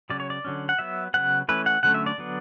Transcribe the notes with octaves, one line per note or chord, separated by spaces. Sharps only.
C#3 F#3 C#4 D5
C#5
D5
D3 F#3 C#4
F#5
F#3 B3 E5
C#3 F#3 B3 F#5
E3 A3 C#4 B4
F#5
D3 F#3 A3 C#4 F#5
E5
D5
D3 F#3 B3